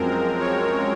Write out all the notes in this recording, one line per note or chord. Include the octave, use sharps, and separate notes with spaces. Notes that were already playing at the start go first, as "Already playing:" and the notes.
Already playing: F#2 F3 G#3 C4 A#4
C#5